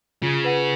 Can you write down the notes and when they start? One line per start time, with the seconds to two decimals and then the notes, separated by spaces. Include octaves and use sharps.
0.22 C#3 F4
0.44 B4 F#5